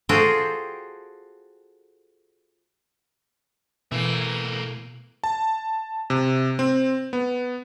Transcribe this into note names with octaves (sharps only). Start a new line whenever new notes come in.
F4 F#4 G#4 A4 C5 G5
B2 E3 A3 A#3
A5
C3
C4
B3